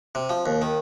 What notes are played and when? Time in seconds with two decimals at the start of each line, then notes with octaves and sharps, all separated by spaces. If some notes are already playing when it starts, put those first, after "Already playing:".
0.15 C3
0.30 F3
0.46 D#2
0.62 D#3